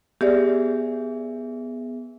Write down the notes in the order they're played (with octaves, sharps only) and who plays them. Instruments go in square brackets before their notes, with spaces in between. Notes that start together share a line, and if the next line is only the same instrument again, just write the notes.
[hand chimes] B3 G#4 E5 [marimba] G4 D5